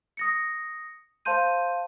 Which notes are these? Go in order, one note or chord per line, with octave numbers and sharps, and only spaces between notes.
D#6 A#6 C#7
C5 F5 A5 C6 G6 D#7